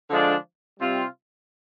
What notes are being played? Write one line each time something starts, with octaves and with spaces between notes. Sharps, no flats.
D3 F3 G#3 D4
C3 G3 C4 F4